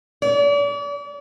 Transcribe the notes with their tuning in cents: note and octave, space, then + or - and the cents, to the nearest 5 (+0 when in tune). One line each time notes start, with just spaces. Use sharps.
D5 -40